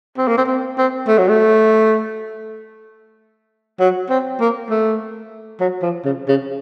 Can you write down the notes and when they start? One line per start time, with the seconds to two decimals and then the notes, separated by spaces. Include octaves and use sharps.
0.18 C4
0.28 A#3
0.37 C4
0.47 C4
0.78 C4
1.08 A3
1.18 F#3
1.28 A3
3.80 F#3
4.09 C4
4.40 A#3
4.69 A3
5.60 F#3
5.82 F3
6.05 C#3
6.28 C#3